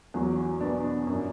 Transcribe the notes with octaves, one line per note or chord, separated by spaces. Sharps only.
E2 F#3
B2 B3 D4
F#2